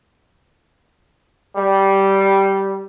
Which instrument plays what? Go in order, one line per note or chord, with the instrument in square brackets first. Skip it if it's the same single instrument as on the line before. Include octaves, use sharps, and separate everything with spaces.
[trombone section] G3